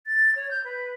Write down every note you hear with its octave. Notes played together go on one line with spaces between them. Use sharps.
A6
C#5
G6
B4